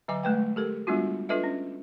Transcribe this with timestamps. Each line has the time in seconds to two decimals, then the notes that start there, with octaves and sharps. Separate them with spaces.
0.08 D3 F#3 D#5 G#5 D6
0.23 G#3 A3 B4 G5
0.56 G4 A4 A#4
0.87 G3 G#3 B3 D4 F4 F#4
1.29 D4 F4 A4 B4 D#5 E5
1.44 C#4